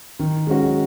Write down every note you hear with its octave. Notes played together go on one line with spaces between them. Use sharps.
D#3
G#3 C#4 F#4